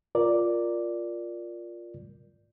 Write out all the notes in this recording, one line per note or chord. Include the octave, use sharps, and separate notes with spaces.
F4 A#4 D5